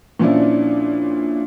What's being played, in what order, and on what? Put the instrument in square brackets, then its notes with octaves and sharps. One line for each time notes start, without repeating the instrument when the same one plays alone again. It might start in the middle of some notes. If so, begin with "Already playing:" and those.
[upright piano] A#2 F3 C#4 D4 E4